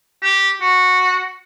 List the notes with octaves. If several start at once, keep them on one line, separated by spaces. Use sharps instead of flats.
G4
F#4